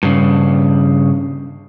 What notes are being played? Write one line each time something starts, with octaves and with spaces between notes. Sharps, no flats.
G2 C#3